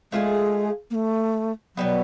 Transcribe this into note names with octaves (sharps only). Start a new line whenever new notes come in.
G#3 A3 D4 F4 G#4
A#3
A3
B2 F#3 G3 B3